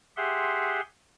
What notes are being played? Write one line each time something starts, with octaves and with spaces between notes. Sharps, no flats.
G4 G#4 E5 F#5 C6